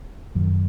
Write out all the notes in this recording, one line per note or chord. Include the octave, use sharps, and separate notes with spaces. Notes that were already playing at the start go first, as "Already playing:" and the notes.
F#2 D#3 F#3